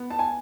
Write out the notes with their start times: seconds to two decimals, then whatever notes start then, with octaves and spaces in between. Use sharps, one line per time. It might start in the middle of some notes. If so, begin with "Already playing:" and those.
Already playing: B3
0.10 A5
0.19 G#5